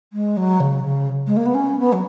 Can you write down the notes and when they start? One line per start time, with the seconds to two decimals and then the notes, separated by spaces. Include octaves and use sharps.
0.13 G#3
0.37 F#3
0.60 C#3
0.83 C#3
1.27 G#3
1.37 A#3
1.46 B3
1.54 C#4
1.79 B3
1.92 F#3